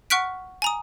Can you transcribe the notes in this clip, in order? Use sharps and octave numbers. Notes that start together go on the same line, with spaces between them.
F#5 C#6 F6 F#6 B6 D7
G#5 A#5 D#6